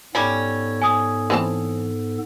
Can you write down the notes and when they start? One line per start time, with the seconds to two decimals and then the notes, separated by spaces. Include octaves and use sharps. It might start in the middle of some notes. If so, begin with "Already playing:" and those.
0.15 G#2 G3 B3 C#4 A4
0.82 G#5 D#6
1.30 E3 C4 A5